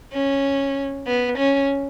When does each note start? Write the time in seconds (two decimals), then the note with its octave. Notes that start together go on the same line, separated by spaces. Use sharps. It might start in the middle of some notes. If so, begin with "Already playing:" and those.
0.13 C#4
1.07 B3
1.38 C#4